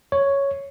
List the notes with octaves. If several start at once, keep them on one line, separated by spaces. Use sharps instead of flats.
C#5